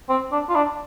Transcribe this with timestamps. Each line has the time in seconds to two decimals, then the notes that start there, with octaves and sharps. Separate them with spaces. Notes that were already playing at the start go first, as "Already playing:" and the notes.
0.09 C4
0.32 D4
0.49 F4
0.55 D4